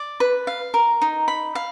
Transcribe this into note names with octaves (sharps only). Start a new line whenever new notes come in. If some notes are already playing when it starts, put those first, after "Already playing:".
Already playing: D5
B4
F5
A#4
D#4
B5
F5